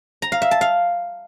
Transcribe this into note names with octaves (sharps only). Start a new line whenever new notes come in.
A#5
F5
E5
A5
F5